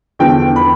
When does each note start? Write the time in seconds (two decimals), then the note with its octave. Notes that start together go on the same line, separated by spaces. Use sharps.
0.19 E2 D3 F3 G5
0.56 B5